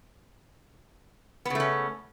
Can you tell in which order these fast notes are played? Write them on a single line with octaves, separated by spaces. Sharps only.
B3 C#3 A3 C#4